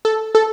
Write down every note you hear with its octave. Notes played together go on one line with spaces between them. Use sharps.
A4
A4